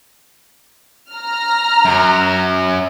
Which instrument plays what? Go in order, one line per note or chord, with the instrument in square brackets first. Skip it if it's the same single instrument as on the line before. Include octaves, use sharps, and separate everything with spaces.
[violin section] A#5 F6
[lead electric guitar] F#2 F#3